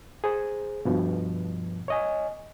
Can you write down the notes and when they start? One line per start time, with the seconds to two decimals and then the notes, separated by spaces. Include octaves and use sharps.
0.24 G#4 C5
0.85 G2 B2 F3
1.88 C#5 D#5 G#5